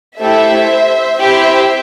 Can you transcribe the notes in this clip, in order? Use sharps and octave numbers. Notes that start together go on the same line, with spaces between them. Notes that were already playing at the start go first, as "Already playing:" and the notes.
A3 E4 G4 C5 E5
C4 E4 G4 C5 E5